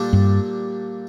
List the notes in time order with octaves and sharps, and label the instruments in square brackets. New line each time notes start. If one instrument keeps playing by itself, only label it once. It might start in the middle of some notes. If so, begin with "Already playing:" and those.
Already playing: [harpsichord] A#2 G3 D4 A4
[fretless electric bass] G2